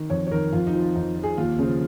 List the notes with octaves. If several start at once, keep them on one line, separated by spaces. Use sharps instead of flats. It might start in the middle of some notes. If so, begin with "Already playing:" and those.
Already playing: D#3
F2 C#5
C#5
D#3 A#4
F2 F4
D#4
F3
F4
F2 D#4
F3
G#4
D#2 F4
C#3 F3